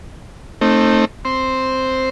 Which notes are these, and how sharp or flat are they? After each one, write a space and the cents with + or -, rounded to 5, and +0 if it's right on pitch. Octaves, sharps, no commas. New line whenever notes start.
A3 +15 C4 +25 D#4 -5
C4 +0 C5 +0